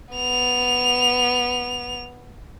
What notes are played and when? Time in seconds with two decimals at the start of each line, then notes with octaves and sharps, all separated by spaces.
0.14 B3 F7